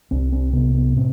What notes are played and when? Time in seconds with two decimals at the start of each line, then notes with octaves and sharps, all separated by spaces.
0.11 C2 C4
0.32 C4
0.53 C3 B3
0.74 B3
0.97 A2 C4